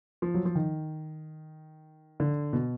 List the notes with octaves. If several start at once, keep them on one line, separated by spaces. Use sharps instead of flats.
F3
F#3
F3
D#3
D3
B2